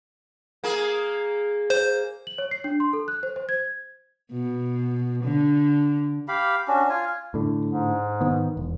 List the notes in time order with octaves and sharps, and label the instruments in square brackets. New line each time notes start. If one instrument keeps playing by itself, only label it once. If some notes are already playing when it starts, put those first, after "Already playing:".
[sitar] A#3 G#4
[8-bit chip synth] C5
[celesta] F#7
C#5
C7
D4
C6
A4
F#6
C5
C5
G#6
[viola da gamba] B2
D3
[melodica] G4 F5 B5
C#4 D4 F#4
F4 G#5
[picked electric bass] A2 D3
[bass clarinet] G#2
[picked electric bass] D#3 B3
E1